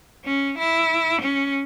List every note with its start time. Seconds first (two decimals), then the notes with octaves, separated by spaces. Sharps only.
0.25 C#4
0.58 E4
1.21 C#4